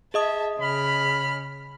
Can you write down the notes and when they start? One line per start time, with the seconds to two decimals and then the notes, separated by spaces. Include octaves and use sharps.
0.14 G#4 D#5 E5 A5 D#6
0.58 C#3 B5 F6